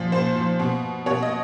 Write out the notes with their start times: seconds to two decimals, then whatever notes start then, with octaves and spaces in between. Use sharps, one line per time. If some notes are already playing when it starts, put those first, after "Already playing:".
Already playing: A#2 F3
0.12 A#2 C5
0.36 F3
0.60 B2
1.06 B2 C#5
1.22 D#5